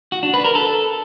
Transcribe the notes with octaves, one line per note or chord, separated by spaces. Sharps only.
F#4
D4
B4
A#4
A4